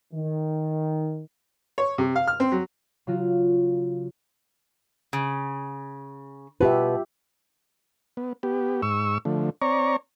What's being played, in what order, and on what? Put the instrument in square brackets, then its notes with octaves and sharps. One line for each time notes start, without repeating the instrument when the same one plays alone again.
[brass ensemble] D#3
[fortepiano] C#5
C3
F5
F6
C4
F#3
[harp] C#3 F#3 F4 F#4
[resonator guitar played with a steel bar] C#3
[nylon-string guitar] B2 B4 [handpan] F4 G4 E5
[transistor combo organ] B3
B3 G4
G#2 C#6 E6
D3 F3 A3
C4 C#5 D5 A#5 C#6